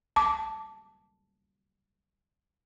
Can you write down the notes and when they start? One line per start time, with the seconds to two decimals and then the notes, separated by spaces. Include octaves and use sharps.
0.16 A5 D6